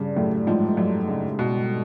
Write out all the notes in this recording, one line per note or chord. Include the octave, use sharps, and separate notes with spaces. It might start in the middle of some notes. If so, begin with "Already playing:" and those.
Already playing: G2 C#3
F#2 A2
G#2 F3
F#2
C#3
B2